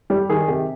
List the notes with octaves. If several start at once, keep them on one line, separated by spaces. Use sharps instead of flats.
G3 G4
D#3 G#4
C3 G4